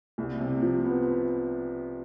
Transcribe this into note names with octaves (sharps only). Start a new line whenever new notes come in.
C2
C3
F3
B3